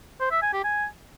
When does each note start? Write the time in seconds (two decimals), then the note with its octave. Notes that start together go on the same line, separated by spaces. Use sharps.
0.21 C5
0.31 E5
0.42 G#5
0.53 G4
0.64 G#5